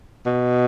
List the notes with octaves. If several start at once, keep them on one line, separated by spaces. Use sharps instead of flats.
B2